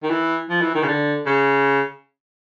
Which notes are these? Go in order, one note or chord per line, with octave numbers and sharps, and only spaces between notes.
D#3
E3
F3
E3
D#3
C#3
D3
C#3